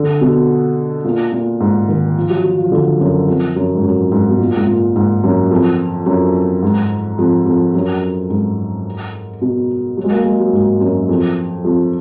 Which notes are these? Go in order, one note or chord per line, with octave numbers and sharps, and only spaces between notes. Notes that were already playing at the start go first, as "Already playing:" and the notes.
Already playing: D3
B2
A#2
A#2
G#2
D#3
F3
F#3
F#3
F3
D3
F#2
F2
F#2
G#2
F#2
G#2
B2
A#2
G#2
A#2
G#2
F#2
F2
F#2
G#2
F2
F2
F#2
G#2
B2
F#3
G#3
A#3
G#3
F#3
G#2
F#2
F2
F2